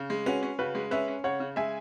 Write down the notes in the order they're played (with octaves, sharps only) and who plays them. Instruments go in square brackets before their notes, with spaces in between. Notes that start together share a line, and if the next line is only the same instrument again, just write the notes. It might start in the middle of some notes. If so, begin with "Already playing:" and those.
Already playing: [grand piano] C#3
G#3
[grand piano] C#4 [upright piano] F#4 B4
[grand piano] C#4
[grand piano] C#3 [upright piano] F#4 B4
[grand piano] G#3
[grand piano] C#4 [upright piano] B4 E5
[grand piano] C#4
[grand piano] C#3 [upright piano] C#5 F#5
[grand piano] C#3
[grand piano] G#3 [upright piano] E5 G#5